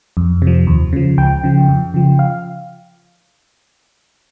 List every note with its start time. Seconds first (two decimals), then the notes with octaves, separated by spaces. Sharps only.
0.17 F2
0.42 C3
0.47 F3
0.67 D#2
0.93 C#3 F3
1.18 C#2 G5
1.44 C#3 F3
1.68 F2
1.94 C#3 F3
2.19 F5